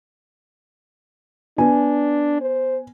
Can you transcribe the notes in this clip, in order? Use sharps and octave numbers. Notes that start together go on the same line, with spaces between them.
B3 D4 G#5
C5